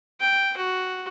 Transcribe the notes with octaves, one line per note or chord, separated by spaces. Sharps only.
G5
F#4